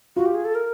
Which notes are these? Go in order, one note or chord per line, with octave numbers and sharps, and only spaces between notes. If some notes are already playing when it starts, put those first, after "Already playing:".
F4 F#4
G4
G#4
A4
A#4